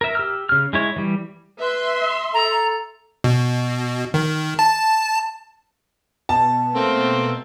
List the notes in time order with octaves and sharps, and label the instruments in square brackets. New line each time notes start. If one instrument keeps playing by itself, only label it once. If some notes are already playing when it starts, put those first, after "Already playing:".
[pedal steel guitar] A#4 E5
G4 E6 F6
C#3 F6
G#3 E4 C#5
E3 G3
[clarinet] B4 [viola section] E5 C6
[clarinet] A4 [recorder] A#5
[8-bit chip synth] B2
D#3
A5
[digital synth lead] B2 [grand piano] A5
[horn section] A3 A#3 C4